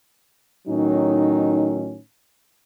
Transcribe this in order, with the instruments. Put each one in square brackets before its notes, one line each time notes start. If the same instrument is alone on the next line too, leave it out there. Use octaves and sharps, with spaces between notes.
[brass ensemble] A2 D#3 F#3 C#4 D#4